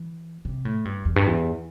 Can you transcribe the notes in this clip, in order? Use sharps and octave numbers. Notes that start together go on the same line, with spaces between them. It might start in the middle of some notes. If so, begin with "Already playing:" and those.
Already playing: E3
C3
A2
G2
E2
G2
E2